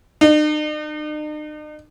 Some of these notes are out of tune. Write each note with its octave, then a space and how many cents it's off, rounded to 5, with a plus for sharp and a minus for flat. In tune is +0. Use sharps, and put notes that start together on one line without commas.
D#4 -45